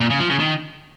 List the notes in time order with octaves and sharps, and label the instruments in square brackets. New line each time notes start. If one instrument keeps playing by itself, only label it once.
[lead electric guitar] A#2
C#3
F3
C#3
D#3